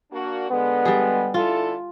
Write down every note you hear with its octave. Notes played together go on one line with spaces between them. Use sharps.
A#3 D4 F#4
D3 G#3 B3
G3 G#4
D3 E4 F4 A4